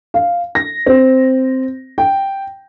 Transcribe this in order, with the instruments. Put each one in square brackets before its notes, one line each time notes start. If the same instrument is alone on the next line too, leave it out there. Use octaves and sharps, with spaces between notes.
[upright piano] F5
A#6
C4
G5